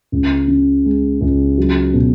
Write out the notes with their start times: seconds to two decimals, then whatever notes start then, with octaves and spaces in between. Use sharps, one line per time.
0.12 C#2
0.48 C#3
0.85 G#3
1.21 C#2
1.58 F#3
1.94 B2